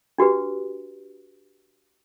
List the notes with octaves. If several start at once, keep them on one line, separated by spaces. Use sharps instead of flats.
D4 F#4 G4 B4